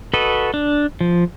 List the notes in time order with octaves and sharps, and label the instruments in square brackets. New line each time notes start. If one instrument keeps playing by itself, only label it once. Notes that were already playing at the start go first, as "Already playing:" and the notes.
[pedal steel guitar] F#4 A4 B4 D#5
D4
F3